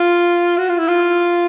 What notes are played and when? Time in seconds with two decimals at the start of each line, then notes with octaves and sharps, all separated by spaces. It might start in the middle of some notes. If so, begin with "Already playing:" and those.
Already playing: F4
0.58 F#4
0.69 F4
0.78 E4
0.88 F4